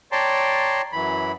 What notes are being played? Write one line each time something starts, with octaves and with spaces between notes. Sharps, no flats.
C#5 D5 G5 A5 A#5 C6
F#2 E3 B5